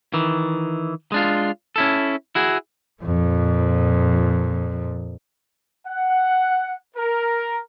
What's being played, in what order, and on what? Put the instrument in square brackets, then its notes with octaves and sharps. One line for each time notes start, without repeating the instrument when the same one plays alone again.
[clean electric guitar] D#3 E3
G#3 D4 F4
C#4 E4 A4
E4 F#4 G#4
[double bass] F2 A#2
[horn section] F#5
A#4